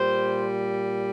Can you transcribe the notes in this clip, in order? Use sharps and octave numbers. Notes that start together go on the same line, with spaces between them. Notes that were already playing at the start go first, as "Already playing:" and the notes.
Already playing: A#2 G3 C5